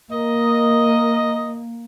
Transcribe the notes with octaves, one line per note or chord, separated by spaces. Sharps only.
A#3 A#4 D#5